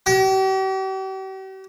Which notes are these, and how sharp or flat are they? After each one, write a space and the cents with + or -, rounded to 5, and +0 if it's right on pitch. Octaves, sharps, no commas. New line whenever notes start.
G4 -45